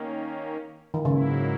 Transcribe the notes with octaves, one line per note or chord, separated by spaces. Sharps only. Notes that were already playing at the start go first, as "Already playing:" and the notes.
Already playing: D#3 A#3 C#4
D#3
G#2 C#3 F#3 A#3 E4